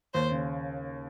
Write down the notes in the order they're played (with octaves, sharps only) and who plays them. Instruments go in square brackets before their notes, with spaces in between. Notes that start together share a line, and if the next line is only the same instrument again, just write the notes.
[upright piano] D#2 [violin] C5
[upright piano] C#3